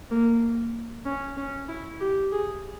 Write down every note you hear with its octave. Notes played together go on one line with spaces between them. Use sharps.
A#3
C#4
C#4
E4
G4
G#4